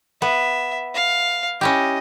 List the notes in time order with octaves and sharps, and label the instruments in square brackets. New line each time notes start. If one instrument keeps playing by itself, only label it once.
[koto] B3 [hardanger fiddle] E5
[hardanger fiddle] F5
[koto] C#4 E4 G4 [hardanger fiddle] D#5